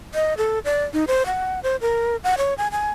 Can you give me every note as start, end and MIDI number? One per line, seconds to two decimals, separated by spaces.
0.15 0.34 75
0.38 0.59 69
0.65 0.84 74
0.94 1.04 63
1.07 1.26 72
1.26 1.60 78
1.63 1.76 72
1.81 2.17 70
2.24 2.35 78
2.38 2.54 73
2.58 2.68 80
2.72 2.91 80